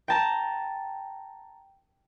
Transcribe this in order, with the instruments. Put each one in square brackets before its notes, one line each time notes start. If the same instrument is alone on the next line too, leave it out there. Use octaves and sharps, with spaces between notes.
[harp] G5 A5 A#5